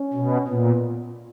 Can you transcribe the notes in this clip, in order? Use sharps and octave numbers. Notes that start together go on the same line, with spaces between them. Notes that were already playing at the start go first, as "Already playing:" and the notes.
Already playing: C#4
B2
A#2 B3